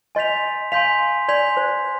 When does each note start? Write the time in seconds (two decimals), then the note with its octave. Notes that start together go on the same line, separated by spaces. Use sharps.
0.15 D#5 G#5 C6 G6 B6 F7
0.72 F5 G#5 C6 G6 B6 F7
1.29 D5 G#5 C6 G6 B6 F7
1.57 C5